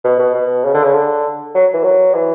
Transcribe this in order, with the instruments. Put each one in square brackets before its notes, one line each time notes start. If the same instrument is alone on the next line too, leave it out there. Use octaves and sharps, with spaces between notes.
[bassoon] B2
B2
B2
C#3
D3
C#3
D3
F#3
E3
F#3
E3